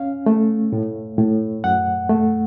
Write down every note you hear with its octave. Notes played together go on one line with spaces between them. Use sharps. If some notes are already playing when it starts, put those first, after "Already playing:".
Already playing: C#4 F5
A3
A2
A2
F#2 F#5
A3